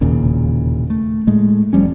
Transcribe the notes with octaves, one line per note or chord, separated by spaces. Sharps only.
E1 D#2 A#2 C#3
A3
A2 G#3 A3
F1 F3 G3 C#4